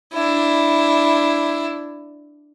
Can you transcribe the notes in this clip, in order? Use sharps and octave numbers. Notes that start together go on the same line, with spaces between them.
D4 E4